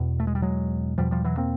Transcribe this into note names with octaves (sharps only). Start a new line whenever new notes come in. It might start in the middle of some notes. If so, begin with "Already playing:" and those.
Already playing: E2 B2
A3
G#3
G3
F#3 G#3
E2 B2 F3 G3
F3 G3
E3 F#3
A#3 C4